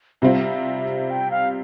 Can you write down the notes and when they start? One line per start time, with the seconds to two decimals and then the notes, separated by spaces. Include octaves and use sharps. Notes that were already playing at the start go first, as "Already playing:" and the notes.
0.22 C3 G3 C4 F4 E5
1.10 G5
1.31 F5